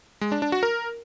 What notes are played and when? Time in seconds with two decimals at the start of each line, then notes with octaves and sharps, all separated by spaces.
0.21 G#3
0.32 D4
0.42 D4
0.52 F#4
0.63 A#4